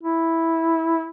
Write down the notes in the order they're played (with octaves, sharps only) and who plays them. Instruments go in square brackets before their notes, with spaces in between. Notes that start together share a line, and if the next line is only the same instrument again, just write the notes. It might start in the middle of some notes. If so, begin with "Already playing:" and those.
[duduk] E4